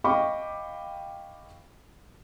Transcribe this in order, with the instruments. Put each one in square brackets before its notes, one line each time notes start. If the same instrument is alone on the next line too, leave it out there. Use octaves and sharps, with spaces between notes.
[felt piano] D#5 F5 G5 B5 C#6 D6